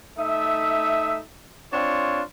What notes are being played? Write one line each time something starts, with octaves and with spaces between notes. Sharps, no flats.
A3 D#4 E5
C4 D4 F4 C#5